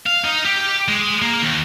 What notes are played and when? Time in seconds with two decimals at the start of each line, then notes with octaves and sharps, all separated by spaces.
0.06 F5
0.24 D#4
0.45 G4
0.88 G#3
1.22 A#3
1.43 D#2